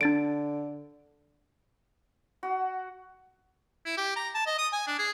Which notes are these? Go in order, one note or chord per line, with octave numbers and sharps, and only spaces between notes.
D3 D4 A6 D7
F#4
E4
G4
A#5
A5
D#5
D#6
G#5
D4
G#4